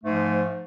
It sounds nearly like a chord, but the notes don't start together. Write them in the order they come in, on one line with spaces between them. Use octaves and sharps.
A3 G#2 F3